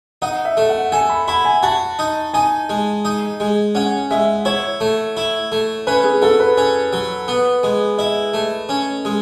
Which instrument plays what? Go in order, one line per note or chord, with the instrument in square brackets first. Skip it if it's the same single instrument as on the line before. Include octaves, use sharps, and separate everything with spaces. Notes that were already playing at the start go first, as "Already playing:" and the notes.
[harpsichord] D#4 [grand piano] F#5
[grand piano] E5
[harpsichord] A3
[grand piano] F#5
[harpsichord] A4 [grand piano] G#5
[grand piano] B5
[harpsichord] E4 [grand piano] B5
[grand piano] G#5
[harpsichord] F#4 [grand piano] A5
[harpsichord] D#4
[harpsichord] D#4 [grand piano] G#5
[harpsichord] G#3
D#4
G#3
[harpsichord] C#4 [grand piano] F#5
[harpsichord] G#3 [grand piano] E5
[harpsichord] E4 [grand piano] C#5
[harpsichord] A3
E4
A3
[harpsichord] C#4 [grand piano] B4
[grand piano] G#4
[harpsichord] F#3 [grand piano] A4
[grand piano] B4
[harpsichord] C#4
F#3
B3
G#3
[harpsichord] E4 [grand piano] D#5
[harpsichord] A3
C#4
G#3